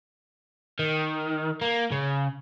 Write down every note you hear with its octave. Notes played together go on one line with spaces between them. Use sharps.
D#3
A#3
C#3